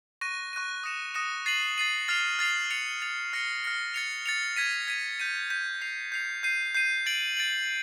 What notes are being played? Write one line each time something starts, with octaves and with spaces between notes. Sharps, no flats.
C#6 F#6 A#6 D#7
C#6 F#6 A#6 D#7
D#6 F#6 A#6 C#7 E7
D#6 F#6 A#6 C#7 E7
A6 C7 D#7 F#7
A6 C7 D#7 F#7
F6 A6 C7 F7
F6 A6 C7 F7
A6 C#7 F7
A6 C#7 F7
F6 A#6 C#7
F6 A#6 C#7
A6 C#7 F7
A6 C#7 F7
G#6 B6 D#7
G#6 B6 D#7
G6 B6 D#7
G6 B6 D#7
G6 C7 F7
G6 C7 F7
G6 C7 D#7
G6 C7 D#7
A6 D7 F#7
A6 D7 F#7